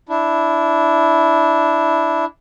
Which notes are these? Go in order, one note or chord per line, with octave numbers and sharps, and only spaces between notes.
D4 E4